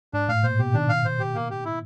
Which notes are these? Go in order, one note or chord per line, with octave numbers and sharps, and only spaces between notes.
G#2 D4
A2 F5
A#2 C5
B2 G4
D#3 D4
F5
C5
G4
A#3
G4
E4